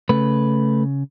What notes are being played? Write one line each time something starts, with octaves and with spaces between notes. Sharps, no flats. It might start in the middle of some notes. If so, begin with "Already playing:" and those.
C#3 A3 B4